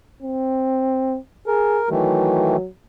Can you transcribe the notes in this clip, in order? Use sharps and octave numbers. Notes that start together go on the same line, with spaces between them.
C4
G#4 A#4
D#3 E3 F#3 A3